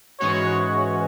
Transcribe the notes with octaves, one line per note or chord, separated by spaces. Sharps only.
G#2 E3 G#3 C#4 F#4 C#5